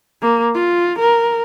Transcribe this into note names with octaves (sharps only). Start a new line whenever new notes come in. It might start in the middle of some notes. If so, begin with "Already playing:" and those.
A#3
F4
A#4